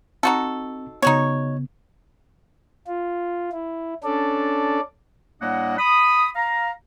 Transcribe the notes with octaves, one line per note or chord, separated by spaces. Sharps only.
C4 D#4 F#4 A4
C#3 B3 D#4 F#4 C#5
F4
E4
C#4 D4 A4 D5
A2 G3 A#3 D4 D#5 F#5
B5 D#6
F5 A#5